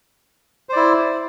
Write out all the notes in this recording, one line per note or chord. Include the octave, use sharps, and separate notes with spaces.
E4 C5 D5